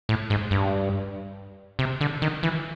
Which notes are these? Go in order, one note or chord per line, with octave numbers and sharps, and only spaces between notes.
A2
G#2
G2
C3
D3
D#3
E3